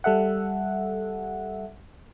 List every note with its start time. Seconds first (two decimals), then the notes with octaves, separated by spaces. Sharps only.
0.04 G3 A4 E5 F#5